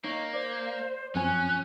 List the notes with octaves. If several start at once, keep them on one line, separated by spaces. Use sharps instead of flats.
A#3 D#4 C#5
C5 D5
F#2 F3 C4 C#4 G#5 F#6